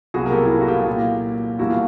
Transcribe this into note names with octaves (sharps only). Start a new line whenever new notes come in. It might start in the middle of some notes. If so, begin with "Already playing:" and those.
C2 B2 F#3 A#3 F#4 G#4
A#4
G4 A4
E4
F4
F#4
F4 G4
A#2 F#3 A#3
E2 B2 G3 A#3 E4 F#4
F4